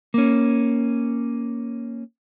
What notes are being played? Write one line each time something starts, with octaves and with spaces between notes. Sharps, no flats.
A#3 C#4